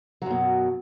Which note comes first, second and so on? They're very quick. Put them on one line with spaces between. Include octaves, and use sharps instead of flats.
F#3 F#2 B2